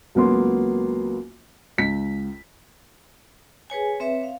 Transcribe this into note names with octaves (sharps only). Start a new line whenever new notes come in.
C#2 F#3 A#3 B3 C6
C#2 B6
G#4 B4 C#5 G#5
C4 B4 C#5 E5
F5